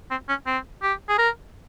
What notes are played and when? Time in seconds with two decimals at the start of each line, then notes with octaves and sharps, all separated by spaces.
0.10 C4
0.29 C#4
0.47 C4
0.82 G4
1.09 G#4
1.18 A#4